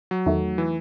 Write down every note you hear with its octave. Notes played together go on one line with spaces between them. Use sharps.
F#3
E2 D#3 A3
E3